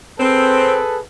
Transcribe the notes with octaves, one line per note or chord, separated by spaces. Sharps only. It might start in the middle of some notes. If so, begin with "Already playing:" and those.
C4 G#4 A4 B4